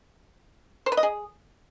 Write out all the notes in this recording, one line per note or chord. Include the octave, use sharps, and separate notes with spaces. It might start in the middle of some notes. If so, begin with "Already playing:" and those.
C5
B4
D#5
G#4